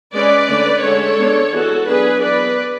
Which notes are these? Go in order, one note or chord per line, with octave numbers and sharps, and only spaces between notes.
G#3 C#4 B4 D5
D3 A3 C#4
D3 G#3 C#4 A4 C#5
G#3 B3 D4
E3 G#3 B3 F#4 A4
F#3 B3 D4 G#4 B4
E3 B3 D4 B4 D5